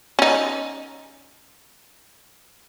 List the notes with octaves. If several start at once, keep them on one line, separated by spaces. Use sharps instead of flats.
C#4 D#4